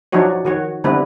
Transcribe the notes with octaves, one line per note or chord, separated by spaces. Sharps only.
F3 F#3 D4 D#4 F#4 C#5
D#3 F#4 C#5
D3 G3 B3 C4 E4 B4